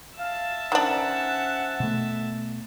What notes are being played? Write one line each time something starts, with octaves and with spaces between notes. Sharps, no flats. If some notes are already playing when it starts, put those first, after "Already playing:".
E5 F5 A5
D#3 C#4 D4 C5 F#5
B2 A3